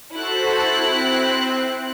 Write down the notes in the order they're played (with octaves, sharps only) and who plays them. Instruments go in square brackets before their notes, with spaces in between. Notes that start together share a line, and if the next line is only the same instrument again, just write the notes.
[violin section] E4 F#6 [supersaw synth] F#4 A4 C5
[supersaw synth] C4